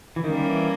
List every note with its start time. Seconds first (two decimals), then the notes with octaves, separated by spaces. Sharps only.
0.16 E3
0.24 D#3 G3 A#3 C#4
0.35 D#3
0.45 E3